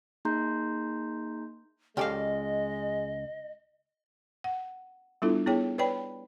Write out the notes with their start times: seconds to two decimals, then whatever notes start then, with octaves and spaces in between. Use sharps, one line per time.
0.25 A#3 D#4 G#4 A#5 C6 G6
1.97 C#2 G#3 C#4 G4 A4 D5 D#5 F5
4.44 F#5
5.22 G3 B3 D4 E4 F4 A4
5.46 B3 E4 G#4 C#5 G5
5.78 B4 C#5 D5 G5 B5